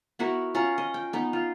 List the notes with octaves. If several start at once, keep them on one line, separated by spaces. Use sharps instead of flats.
B3 E4 F#4 A#4
C#4 F4 F#5 A#5
D#5
G5
B3 D#4
F4